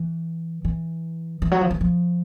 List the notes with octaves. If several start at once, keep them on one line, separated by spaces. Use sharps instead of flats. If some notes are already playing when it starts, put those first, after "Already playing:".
Already playing: E3
E3
E3
F#3
F3
E3
F3